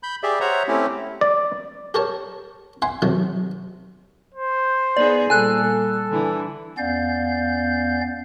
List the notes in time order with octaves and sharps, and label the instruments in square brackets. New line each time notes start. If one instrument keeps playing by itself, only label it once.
[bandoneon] B5 G6
G4 G#4 D5 E5
C5 C#5 E5 F#5 A#5
A3 C4 C#4 E4 G4
[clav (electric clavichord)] D5
[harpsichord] G4 A4 A#4 C#5 A5
E5 F#5 G#5 C6
C3 D#3 F#3 A3
[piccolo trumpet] C5
[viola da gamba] B3 D#4 G#4 [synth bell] D5
[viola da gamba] A#2 G3 [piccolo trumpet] A4 [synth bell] G#5 F#6
[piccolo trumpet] A4
[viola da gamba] D3 E3
[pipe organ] E2 B3 C#4 D5 F5 G6